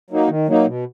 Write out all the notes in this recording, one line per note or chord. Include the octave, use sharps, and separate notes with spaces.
F#3 A#3 D#4
D#3
F#3 A#3 D#4
B2